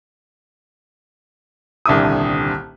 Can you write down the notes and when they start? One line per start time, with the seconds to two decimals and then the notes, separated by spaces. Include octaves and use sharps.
1.86 D#1 C2 D3 E5 D6 D#6